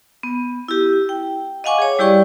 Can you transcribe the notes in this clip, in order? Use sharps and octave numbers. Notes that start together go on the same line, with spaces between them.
B3
E4 G4
G5
D#5 F5 F#5 G#5 C#6 D6
G#4 C#5
G3 E4 G4 D5 G5 C#6